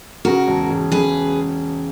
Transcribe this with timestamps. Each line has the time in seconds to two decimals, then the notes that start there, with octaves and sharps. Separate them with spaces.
0.25 C#3 F#4 A#4
0.47 E1
0.70 E1
0.92 C#3 G#4 B4